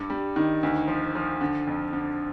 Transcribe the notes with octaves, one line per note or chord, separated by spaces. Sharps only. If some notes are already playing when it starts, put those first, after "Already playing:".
Already playing: G2
G3
D#3
D2
F3
F3
D3
F2
D3